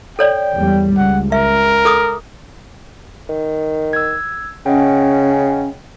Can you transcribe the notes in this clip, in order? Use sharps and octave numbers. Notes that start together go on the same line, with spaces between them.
A4 C#5 D5 G5
E2 G3
C#2 F#5
A#4 E5
A4 D6 D#6
D#3
E6 G#6
C#3 C#4 D#5 F#5 G5